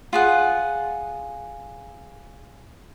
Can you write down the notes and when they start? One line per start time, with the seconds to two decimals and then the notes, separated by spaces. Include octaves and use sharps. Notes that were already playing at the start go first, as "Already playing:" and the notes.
0.13 F4 G#4 F#5